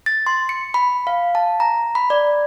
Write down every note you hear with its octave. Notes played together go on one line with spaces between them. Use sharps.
A6
C6
C#7
B5
F5
A5
A#5
B5
D5